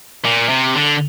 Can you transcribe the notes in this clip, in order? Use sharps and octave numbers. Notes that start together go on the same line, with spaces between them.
A#2
C3
D3